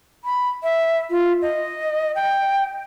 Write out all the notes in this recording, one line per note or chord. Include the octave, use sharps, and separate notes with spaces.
B5
E5
F4
D#5
G5